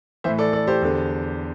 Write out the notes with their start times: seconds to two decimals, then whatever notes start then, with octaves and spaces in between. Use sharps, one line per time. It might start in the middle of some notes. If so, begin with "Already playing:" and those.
0.24 A2 E3 C5 E5
0.39 A4 D5
0.53 A4 D5
0.67 G4 C5
0.82 E2 D3